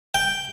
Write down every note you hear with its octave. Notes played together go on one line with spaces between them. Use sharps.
G5